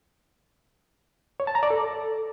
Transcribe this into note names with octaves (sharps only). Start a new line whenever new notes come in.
C#5
A5
A#5
D5
A4